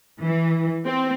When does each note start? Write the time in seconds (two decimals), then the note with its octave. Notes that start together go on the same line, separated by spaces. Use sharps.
0.21 E3
0.85 C4